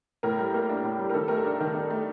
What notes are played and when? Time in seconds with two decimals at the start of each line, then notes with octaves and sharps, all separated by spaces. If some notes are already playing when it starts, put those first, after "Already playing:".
0.23 A2 A#4
0.39 G3
0.54 A#3
0.69 D4
0.84 A2
0.99 G3
1.10 A#4
1.14 D#3 A4
1.28 A3 A#4
1.37 A4
1.45 D4
1.60 D#3
1.75 D#3
1.90 A3